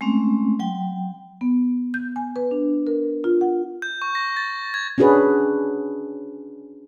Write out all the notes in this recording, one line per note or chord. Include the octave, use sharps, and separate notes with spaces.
G#3 A3 C4 C#4
F#3 G5
B3
G6
G#5
B4
D4
A#4
F4
F#5
G6
C#6
A#6
A6
G#6
C#4 D4 F#4 G#4 B4